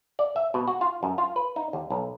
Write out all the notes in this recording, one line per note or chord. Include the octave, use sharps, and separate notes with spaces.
D5
E5
B2
F#4
F4
F#2
F4
B4
D#4
D#2
B1